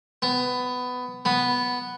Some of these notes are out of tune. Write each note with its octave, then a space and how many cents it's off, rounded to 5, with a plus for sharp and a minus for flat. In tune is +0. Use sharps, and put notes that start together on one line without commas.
B3 +15
B3 +0